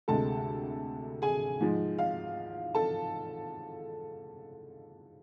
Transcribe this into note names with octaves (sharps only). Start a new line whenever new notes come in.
D2 C3 G#3 A4 A5
G#4 G#5
G#2 F3 G#3
F5
A4 A5